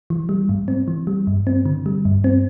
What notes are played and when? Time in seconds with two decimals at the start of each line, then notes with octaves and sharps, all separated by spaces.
0.10 E3
0.29 G3
0.49 G#2
0.68 C4
0.88 E3
1.07 G3
1.27 G2
1.47 C4
1.66 D3
1.86 G3
2.05 G2
2.24 C4